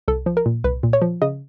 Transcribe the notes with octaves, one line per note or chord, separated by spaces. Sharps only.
C2 A4
F3
A#4
A#2
C2 B4
A#2
C#5
F3
C#3 D#5